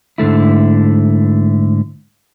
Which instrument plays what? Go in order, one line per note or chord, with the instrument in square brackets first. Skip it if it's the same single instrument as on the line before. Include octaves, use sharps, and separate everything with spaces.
[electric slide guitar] G#2 D3 A3 E4